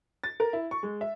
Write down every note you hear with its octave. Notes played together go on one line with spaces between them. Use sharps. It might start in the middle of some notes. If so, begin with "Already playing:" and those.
A6
A#4
E4
C#6
G#3
E5